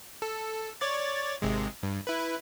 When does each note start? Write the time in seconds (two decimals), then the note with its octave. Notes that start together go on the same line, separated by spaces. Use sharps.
0.22 A4
0.81 C#5 D5 A6
1.42 G#1 C3 G#3
1.83 G2
2.07 E4 B4